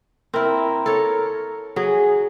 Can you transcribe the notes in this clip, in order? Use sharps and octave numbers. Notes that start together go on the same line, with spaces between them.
C4 E4 A#4
A4 C#5
F#3 G#4